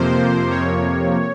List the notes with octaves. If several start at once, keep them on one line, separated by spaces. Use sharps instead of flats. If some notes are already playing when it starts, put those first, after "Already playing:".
Already playing: F2 C3 F3 A#3 C5
C#5